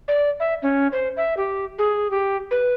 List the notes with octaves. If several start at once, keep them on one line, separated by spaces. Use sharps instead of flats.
D5
E5
C#4
C5
E5
G4
G#4
G4
B4